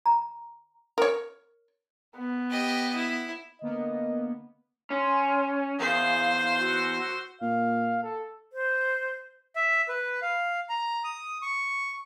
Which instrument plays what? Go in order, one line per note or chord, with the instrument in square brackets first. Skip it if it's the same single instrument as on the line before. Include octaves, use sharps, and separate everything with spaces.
[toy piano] A#5
[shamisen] A#4 C#5
[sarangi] B3
[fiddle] G4 D#5
E4
[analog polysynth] D3 A#3 B3 [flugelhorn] D#5
[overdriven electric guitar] C#4 [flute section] G#5 C6
[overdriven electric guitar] E2 [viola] C5 [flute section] F5
[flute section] F#4 E6
[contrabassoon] A#2 [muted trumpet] F5
[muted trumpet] A4
[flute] C5
[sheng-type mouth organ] E5
B4
F5
A#5
D#6
C#6